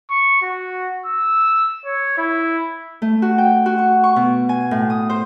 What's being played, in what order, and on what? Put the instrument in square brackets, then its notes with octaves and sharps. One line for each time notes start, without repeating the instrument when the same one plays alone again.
[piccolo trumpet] C#6
F#4
E6
C#5
E4
[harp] A3
F#4
G5
F#4
C#6
C#6
B2
G#5
A2
D#6
C5